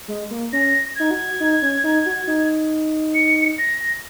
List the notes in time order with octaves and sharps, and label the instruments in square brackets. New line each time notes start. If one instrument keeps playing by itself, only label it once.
[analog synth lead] G#3
A#3
[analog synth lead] C#4 [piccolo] A#6
[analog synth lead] D#4 [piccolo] G#6
[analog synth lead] F#4
D#4
C#4
D#4
F#4
D#4
[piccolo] C#7
A#6